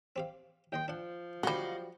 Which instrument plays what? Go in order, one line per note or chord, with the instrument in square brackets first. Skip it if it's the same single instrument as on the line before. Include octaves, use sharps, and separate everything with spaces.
[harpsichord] C4 G4 F5
[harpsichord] D#2 D#5 C6 [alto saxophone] G5
[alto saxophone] F3 [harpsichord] D4 F#5
[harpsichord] D2 B5 [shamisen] F#3 G3 [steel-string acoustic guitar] F#4 D#5 F5